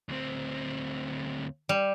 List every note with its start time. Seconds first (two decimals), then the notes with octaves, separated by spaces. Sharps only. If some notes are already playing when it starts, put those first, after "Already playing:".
0.09 D2 C4
1.69 G3